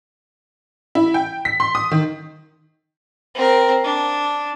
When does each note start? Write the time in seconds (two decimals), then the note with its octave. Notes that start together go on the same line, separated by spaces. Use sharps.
0.95 E4
1.14 G5
1.45 B6
1.60 C6
1.75 D#6
1.91 D#3
3.34 C4 A#4
3.84 D4